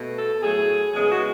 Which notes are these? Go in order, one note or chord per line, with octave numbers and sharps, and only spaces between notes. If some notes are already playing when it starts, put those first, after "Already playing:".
Already playing: B2 A3
A4
A2 F#3 A3 G#4
E2 C#3 G#3 B3 G#4
F#4